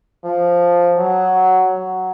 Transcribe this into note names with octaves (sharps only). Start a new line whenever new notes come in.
F3
F#3
F#3